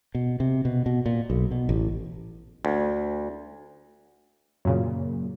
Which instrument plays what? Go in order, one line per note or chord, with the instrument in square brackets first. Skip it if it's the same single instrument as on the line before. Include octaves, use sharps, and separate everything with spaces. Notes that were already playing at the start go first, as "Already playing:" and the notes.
[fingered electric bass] B2
C3
B2
B2
A#2
B1
B2
A1
[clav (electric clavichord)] D2
[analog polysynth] F#2 A#2 C#3